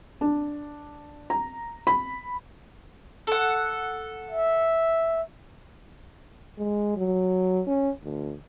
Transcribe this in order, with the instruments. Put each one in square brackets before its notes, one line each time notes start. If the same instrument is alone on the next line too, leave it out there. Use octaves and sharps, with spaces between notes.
[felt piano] D4
A#5
B5
[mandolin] A4 F#5
[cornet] E5
[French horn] G#3
F#3
C#4
D2